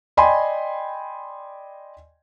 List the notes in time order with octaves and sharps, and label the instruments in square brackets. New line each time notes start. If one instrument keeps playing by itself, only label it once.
[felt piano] D5 D#5 G5 G#5 B5 C6